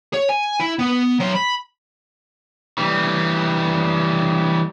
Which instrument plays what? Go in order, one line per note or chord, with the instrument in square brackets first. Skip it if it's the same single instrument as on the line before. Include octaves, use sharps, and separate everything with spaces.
[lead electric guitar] C#5
G#5
E4
B3
F#3 C6
B5
[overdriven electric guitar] E3 G3